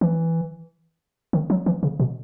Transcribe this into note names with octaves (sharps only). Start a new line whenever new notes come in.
E3
D#3
F#3
E3
C#3
B2